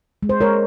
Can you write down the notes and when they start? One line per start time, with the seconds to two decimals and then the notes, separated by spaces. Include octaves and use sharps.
0.23 G#3
0.29 C5
0.40 G#3 A#4 C#5